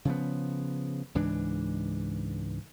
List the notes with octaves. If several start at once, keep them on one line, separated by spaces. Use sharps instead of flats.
C#3 F3 B3
C#2 G#2 E3 D4